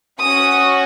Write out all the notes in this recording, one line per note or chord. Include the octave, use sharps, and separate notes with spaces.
C#4 F#4 D#6